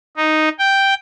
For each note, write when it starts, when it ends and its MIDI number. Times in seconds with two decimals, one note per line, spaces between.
0.17 0.49 63
0.59 0.94 79